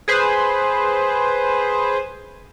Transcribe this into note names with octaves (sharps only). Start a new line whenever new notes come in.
G#4 B4 C5